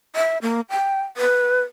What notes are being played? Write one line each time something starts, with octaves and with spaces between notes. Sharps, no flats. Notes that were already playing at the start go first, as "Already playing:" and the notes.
E5
A#3
G5
B4